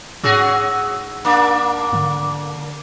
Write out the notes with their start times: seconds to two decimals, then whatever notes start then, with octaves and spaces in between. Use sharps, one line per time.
0.23 G#2 C#4 F#4 G#4 E6
1.25 A#3 D4 D6
1.93 D3